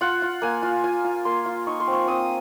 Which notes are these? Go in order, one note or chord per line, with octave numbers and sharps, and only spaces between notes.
F4 F#5
F4
A#3 G#5
F4
F4 G#5
F4
A#3 C6
F4
D#4 C#6
C6
C4
C#6
C4 D#6